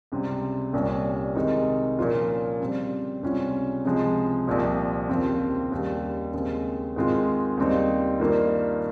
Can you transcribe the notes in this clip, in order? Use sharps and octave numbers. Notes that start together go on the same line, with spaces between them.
C#2 C3 G3 C4
C2 A#2 G3 C#4
C3 D#3 G#3 D#4
A#2 F3 A#3 C#4 F4
C#3 G3 C4
C#2 C3 G3 C#4 F4
C#2 C3 F3 G#3
C2 A#2 F3
D#2 C#3 F3 C4
D#2 C#3 G3
D#2 C#3 G#3 C4
G#2 D#3 G#3 C4 F4
D#2 C#3 G3 C4 D#4
G2 D#3 A#3 F4